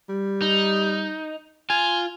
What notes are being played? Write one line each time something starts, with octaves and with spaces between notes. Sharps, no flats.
G3
D#4
F4 G#5